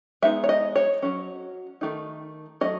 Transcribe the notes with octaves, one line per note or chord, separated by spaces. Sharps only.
G#3 B3 D#4 E5
C#5
D#5
C#5
F#3 C#4
D#3 A3 D#4
F#3 A3 C#4 D#5